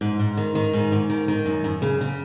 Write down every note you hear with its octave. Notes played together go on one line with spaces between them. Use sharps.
G#2
G#2
D#3
D#3
G#2
G#2
D#3
D#3
F#2
F#2
C#3
C#3